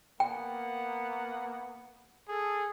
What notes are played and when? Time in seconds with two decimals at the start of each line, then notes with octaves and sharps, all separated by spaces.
0.20 A#3 B3 F#5 G5
2.29 G#4 A4